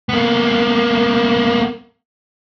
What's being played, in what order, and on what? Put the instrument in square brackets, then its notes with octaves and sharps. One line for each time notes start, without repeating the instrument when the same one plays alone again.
[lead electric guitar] A#3 B3